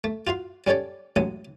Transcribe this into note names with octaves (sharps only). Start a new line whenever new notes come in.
A3
F4 F#4 F5 C6
G3 C#4 A4 C#5 D5
A1 F#3 G#3 D#6